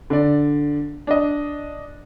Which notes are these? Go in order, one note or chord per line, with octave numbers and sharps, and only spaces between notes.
D3 D5
D4 D#5